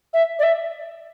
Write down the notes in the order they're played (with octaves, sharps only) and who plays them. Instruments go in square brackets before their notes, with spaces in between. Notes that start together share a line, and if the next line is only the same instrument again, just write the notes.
[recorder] E5
D5
E5